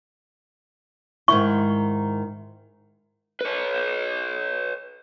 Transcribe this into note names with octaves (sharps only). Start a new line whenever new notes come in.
G#2 D#3 E4 C#6
B4 C#5